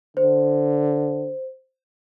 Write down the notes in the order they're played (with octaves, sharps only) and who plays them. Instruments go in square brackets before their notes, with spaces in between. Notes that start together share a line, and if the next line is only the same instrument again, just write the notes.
[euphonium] D3 [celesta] C5